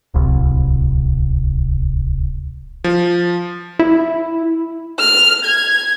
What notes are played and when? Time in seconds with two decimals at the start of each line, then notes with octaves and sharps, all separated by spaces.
0.14 D1 C2
2.84 F3
3.79 E4
4.99 F6
5.44 G#6